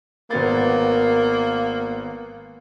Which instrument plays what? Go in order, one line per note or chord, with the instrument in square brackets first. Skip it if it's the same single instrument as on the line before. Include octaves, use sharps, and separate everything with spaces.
[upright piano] G#1 B3 A6 [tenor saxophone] A#3